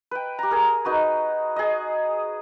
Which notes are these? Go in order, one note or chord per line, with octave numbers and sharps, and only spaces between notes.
B4 G5
G4 A#5
G#4 A#4
D#4 F#4 B4
G#4 D#5